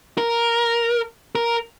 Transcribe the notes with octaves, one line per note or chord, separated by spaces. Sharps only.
A#4
A#4